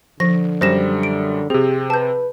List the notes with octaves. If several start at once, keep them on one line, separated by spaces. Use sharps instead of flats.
D3 F3 A#6
F#2 G3 C5 A#6 E7
D7
C3 C4 G4 G#4
B4 A5 G6